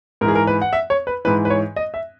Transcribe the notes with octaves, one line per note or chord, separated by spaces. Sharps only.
G#2 E3 G#4 A#4
A#4
B4
F#5
E5
C#5
B4
G#2 E3 B4
B4
C#5
D#5
E5